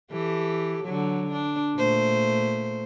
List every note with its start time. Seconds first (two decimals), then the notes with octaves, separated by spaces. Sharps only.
0.11 E3 G4 A4
0.85 D3 F#3
1.32 D4
1.76 A#2 A3 C5